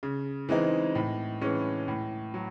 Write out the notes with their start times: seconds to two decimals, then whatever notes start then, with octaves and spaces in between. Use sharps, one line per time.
0.03 C#3
0.49 E3 G#3 C4 D#4
0.95 A2
1.41 E3 G#3 C#4
1.88 A2
2.34 F#3